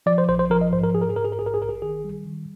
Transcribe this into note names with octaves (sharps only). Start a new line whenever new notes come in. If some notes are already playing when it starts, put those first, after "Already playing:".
F3 D5
C5
A#1 C5
C5
F3 A#4
D#5
G#2 C5
A#4
G#2 G#4
A#4
G#4
G#2 A#4
G#4
A#4
A#1 G#4
A#4
G#4
A#1 A#4
G#4
D#3 G#4
G3
D#3